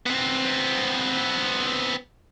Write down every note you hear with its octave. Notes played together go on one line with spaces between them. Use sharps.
B3 C4